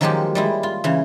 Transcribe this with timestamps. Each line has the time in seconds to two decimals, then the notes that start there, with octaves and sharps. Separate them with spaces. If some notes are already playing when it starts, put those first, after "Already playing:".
0.01 D#3 F3 F#3 G#3 A#3 G4
0.35 G3 G#3 E4
0.63 F4
0.84 C#3 E3